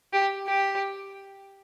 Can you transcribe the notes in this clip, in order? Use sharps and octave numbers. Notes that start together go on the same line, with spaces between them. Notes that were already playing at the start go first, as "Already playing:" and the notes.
G4
G4